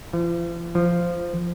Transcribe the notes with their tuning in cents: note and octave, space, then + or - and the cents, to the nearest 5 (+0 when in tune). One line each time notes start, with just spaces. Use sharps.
F3 -45
F3 -10